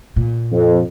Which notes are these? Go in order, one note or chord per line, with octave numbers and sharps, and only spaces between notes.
A#2
F2